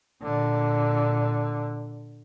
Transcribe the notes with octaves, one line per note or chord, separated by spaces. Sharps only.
A#2 D3